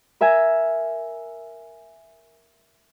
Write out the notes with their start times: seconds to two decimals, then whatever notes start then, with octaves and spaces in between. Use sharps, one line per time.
0.21 A#4 E5 G#5 A#5